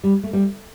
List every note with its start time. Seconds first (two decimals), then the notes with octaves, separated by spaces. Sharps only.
0.04 G3
0.24 A3
0.33 G3